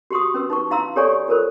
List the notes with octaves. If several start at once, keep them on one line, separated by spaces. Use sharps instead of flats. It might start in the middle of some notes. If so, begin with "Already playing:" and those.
F#4 G4 C6 C#6 D#6
C#4 B4 E6
D#4 B4 C#6
D#4 E4 F5 A#5 C6 E6
G4 A4 C#5 D5 G#5 C#6
F4 A4 A#4 C5